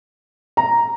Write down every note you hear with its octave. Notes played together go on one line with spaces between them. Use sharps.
A#5